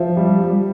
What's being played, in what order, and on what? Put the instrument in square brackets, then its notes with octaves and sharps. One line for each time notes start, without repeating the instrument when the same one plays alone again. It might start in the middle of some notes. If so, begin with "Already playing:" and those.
Already playing: [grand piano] F3 E5
G3
G3